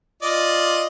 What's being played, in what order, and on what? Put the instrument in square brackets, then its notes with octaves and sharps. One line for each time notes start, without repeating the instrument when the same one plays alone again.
[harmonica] F4 D5 D#5